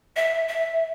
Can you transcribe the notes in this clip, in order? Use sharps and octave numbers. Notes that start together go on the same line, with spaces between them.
E5
E5